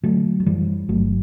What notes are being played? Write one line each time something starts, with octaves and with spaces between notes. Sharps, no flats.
D3 F#3 A3
F#3
F#2 E3 G3
G1 F#3 A3